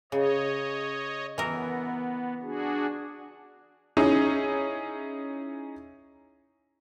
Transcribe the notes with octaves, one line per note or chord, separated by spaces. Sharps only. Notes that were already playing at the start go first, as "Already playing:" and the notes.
C#3 C#5 D#5
E3 B3 A#4
D4 F#4 G#4
C#4 D#4 E4 G#4